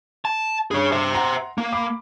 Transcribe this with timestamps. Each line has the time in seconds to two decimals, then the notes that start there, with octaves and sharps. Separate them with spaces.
0.25 A5
0.71 G2 G#4 C#5
0.92 C5 E5
1.13 F#5 A#5 C6
1.58 A#3
1.72 B5 D6